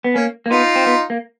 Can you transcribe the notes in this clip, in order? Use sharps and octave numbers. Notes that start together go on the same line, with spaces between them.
B3
A#3 C#4
A#3
B3 D#4 F4
C4
B3
A#3